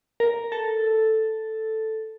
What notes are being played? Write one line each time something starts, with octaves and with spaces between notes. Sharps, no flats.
A#4
A4